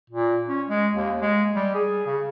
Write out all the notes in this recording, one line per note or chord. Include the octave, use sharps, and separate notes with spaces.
A#2
C#4
G#3
D#2
G#3
G3
G#4
C#3